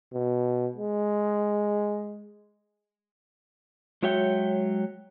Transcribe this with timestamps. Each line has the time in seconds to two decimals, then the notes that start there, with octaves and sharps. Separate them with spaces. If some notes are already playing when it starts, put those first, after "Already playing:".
0.14 B2
0.76 G#3
4.03 F#3 G#3 F#4 C#5 E5 G5